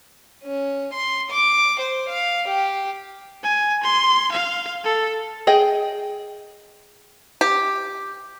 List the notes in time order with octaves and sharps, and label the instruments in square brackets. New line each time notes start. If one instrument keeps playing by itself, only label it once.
[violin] C#4
C6
D6
C5
F5
G4
[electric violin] G#5
C6
F5
A4
[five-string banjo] G#4 D#5 G5
[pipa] G4